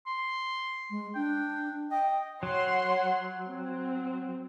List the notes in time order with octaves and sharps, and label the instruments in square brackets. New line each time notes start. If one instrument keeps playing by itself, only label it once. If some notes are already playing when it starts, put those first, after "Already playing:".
[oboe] C6
[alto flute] G#3
[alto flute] D4 [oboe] G5
[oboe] D#5 [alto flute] G5
[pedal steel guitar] F#3 [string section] C#5 F#5 C6
[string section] C4